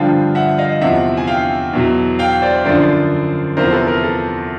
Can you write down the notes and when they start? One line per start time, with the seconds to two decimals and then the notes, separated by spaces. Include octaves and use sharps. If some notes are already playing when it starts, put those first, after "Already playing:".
Already playing: G2 D3 F3 F5 G5
0.35 E5 F#5
0.58 D#5 F5
0.81 E2 C3 F3 E5 F#5
1.17 G#5
1.27 F5 G5
1.73 E2 B2 F#3
2.19 F5 G5
2.42 C5 D5
2.65 F#2 D3 F3 C5 D5
3.57 E2 C3 F3 A#4 C5
3.72 A4 B4
3.87 A#4
4.04 A4